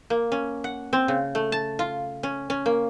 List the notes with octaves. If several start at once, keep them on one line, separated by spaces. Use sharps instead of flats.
A#3
C#4
F#5
C4
C#3
A3
A5
F4
C#4
C#4
A#3